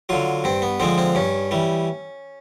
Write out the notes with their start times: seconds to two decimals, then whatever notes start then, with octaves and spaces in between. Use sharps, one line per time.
0.09 D3 F#3 F4
0.44 G2 C4
0.62 B3
0.80 D3 F3 G#3 C4
0.98 C4
1.15 G2 C#4
1.51 E3 G3